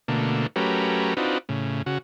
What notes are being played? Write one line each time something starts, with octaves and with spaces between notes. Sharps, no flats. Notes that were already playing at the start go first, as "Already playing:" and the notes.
B2 D3 A3 A#3
F#3 A3 C#4 G4 A#4 B4
C4 D4 D#4 F4 F#4 B4
A2 C#3
C#3 F#4